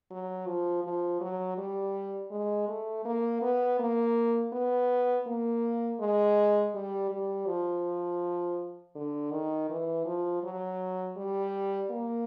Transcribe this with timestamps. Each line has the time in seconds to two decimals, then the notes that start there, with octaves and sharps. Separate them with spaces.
0.11 F#3
0.47 F3
0.84 F3
1.21 F#3
1.58 G3
2.31 G#3
2.68 A3
3.05 A#3
3.42 B3
3.80 A#3
4.53 B3
5.26 A#3
6.00 G#3
6.75 G3
7.11 G3
7.47 F3
8.95 D3
9.32 D#3
9.70 E3
10.06 F3
10.43 F#3
11.17 G3
11.91 A#3